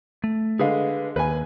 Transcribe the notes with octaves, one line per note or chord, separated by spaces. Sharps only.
A3
D3 G#3 G#4 B4 F5
D#2 B4 G#5